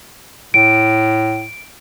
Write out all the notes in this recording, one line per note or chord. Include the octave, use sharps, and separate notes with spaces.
A2 D7